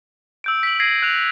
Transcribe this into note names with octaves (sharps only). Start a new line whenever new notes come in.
E6 G6 D7
B6 D7 F#7
G#6 A#6 C7 D7 D#7
F#6 F7